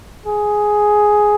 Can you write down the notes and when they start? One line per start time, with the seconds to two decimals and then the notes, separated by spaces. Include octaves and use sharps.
0.26 G#4